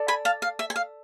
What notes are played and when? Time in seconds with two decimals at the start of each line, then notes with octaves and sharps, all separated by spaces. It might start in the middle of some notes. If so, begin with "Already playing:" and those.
Already playing: A4 D5
0.08 G#5 B5
0.25 F5 A5
0.42 F5
0.59 E5
0.70 G#5
0.76 F5